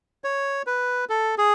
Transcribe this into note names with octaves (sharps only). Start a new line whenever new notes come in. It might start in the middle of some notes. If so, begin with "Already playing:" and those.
C#5
B4
A4
G#4